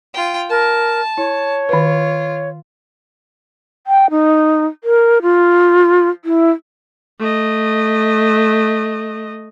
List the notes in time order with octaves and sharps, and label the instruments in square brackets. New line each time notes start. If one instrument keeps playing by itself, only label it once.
[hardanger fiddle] F4 G5
[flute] A#4 [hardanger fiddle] A5
[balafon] E4 [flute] C#5
[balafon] D#3 B4 [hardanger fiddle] F4
[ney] G5
D#4
A#4
F4
E4
[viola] A3 D#5